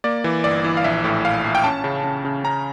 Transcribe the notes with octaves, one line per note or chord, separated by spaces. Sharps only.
A#3 D5
E3
G1 D5
E3
F5
A#1 E5
A2
A#1 F5
A#1
G5
C#4 A5
C#3
C#3
C#3
C#4 A#5